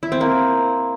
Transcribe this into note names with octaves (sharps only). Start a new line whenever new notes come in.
E4
C4
A#3